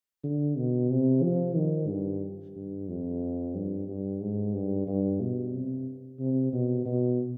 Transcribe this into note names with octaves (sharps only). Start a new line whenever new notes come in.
D3
B2
C3
F3
D#3
G2
G2
F2
G2
G2
G#2
G2
G2
B2
C3
C3
B2
B2